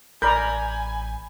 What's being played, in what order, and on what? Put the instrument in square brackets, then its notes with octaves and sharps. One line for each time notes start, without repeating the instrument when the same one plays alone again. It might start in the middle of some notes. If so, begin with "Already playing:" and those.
[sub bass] A1 [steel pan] A#4 D5 A#5 [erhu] G#5 [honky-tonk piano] B5 G6